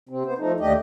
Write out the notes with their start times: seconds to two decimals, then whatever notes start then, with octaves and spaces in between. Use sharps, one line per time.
0.09 C3 C4
0.26 B3 C5
0.38 F3 A3 D#4
0.60 D#2 A3 D4 G4 D#5